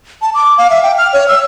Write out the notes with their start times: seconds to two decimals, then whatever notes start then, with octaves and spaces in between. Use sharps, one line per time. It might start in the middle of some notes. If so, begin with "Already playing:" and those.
0.22 A5
0.34 D6
0.58 F5
0.70 E5
0.83 G5
0.98 F6
1.13 C#5
1.28 E6